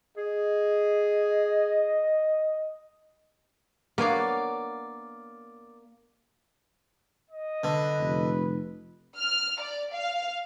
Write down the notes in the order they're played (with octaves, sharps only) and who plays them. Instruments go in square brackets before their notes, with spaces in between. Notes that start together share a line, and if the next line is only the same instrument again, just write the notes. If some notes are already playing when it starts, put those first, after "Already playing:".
[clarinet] G#4 [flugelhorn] D#5
[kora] A#3 [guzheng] B3 D4 C#5 [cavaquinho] D5 F5
[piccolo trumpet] D#5
[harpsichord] D3 [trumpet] B4
[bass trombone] F1
[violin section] F6
D5
F5